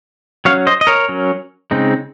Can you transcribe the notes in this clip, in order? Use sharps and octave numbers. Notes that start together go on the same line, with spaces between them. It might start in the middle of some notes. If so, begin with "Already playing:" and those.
F#3 C#4 C#5 F5
C5 D#5
D#5
A#4 C#5
F#3 C#4
C#3 G#3 C4 D#4